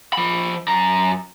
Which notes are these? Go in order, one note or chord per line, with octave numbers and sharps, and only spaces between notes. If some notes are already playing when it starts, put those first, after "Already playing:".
F3 B5
F#2 A#5